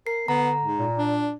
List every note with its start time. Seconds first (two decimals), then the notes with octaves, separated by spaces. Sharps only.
0.07 A#4 C7
0.28 D3 B3 A#5
0.63 G#2
0.79 A#2
0.98 D4